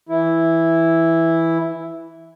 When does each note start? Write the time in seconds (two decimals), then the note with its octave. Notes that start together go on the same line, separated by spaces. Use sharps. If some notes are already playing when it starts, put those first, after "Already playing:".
0.09 E3 E4